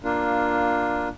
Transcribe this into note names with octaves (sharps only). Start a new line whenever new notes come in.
A#3 D4 F4